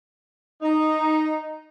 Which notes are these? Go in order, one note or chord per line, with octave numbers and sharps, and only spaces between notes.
D#4